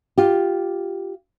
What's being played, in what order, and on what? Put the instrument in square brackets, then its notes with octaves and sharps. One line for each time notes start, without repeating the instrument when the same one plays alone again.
[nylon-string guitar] F4 G4